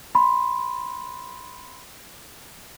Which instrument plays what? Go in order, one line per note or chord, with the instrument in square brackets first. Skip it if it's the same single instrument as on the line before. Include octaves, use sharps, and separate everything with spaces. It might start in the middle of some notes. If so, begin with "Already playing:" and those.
[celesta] B5 C6